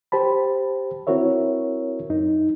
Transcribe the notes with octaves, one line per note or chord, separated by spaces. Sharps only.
G4 C5 A5 B5
C4 E4 F#4 A#4 C#5 E5
F#2 D#4